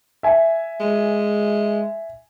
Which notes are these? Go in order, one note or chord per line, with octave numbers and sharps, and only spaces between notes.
E5 G#5
G#3